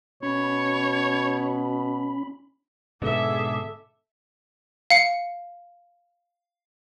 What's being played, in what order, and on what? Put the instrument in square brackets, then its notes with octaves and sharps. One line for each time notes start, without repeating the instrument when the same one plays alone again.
[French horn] B2 [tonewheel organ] C#4 B5 [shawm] C#5
[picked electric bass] G#2 B2 D3 [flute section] G#4 D6 [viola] A4 E5
[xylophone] F5 C#7